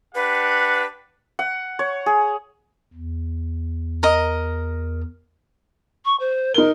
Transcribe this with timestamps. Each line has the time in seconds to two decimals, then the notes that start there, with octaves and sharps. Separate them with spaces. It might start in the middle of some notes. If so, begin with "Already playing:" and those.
0.15 D4 G4 B4 F#5
1.39 F#5
1.79 C#5
2.06 G#4
2.94 E2
4.03 A#4 D#5
6.05 C#6
6.19 C5
6.54 D#4 A#4 G7